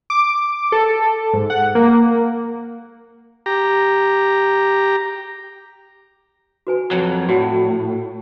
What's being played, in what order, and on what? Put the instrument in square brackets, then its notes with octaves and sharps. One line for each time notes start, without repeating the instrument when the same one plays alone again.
[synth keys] D6
A4
G#2
F#5
A#3
[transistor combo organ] G4 A#5
[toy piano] F#4 B4 G#5
[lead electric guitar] F2 F#3
[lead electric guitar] A2 [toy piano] F#4 D5 F#5